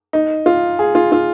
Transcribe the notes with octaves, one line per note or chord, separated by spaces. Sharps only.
D#4
F4
G#4
F4
F4